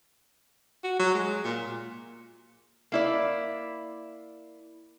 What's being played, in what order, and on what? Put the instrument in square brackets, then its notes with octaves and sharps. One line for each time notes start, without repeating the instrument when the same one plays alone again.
[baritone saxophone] F#4
F#3
G#3
A#2
[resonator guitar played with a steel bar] A#3 E4 D5